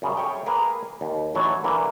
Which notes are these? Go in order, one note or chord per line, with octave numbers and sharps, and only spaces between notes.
F#2 C#3 G3
G#4 A4 C#5 E5 G5
A#3 G#4 A#4 B4
D#2
A1 D3 E3 F#3 A4 C#5
D3 E3 A#3